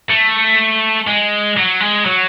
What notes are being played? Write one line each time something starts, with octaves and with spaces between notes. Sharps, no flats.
A3
G#3
F#3
G#3
F#3